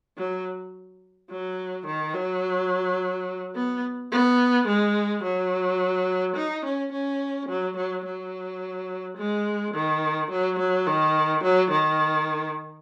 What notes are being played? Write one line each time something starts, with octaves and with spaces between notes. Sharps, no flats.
F#3
F#3
D#3
F#3
B3
B3
G#3
F#3
D#4
C#4
C#4
F#3
F#3
F#3
G#3
D#3
F#3
F#3
D#3
F#3
D#3